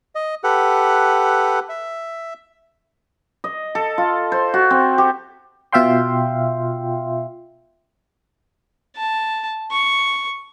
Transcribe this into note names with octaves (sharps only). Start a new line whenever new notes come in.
D#5
G4 A4 B4 F#5
E5
D#5
A4
F4
C5
F#4
C4
G4
B2 F4 E5 F5 G5 C6
A5
C#6